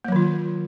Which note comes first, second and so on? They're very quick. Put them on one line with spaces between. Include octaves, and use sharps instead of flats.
A#3 F#3 D#3 F4